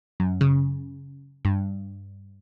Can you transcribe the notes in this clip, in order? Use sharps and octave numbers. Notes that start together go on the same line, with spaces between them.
F#2
C#3
G2